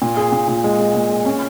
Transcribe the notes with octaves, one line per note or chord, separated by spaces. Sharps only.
A#2
G#4
A#2
A#2
G#3
G#3
A#2
G#4
C#4